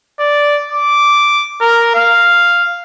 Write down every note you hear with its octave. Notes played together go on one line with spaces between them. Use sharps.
D5
D6
A#4
F5